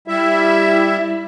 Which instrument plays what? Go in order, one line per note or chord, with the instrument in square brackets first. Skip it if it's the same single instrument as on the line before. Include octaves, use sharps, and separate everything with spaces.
[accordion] G3 E4 E5